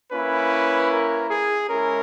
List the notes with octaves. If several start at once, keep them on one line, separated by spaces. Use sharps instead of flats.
A#3 C#4 E4 B4
A#4
G#4
G#3 C#4 E4 A#4